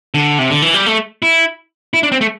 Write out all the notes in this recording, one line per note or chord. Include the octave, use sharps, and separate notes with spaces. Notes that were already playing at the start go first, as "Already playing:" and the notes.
D3
C3
D3
E3
G3
A3
E4
E4
D4
C4
A3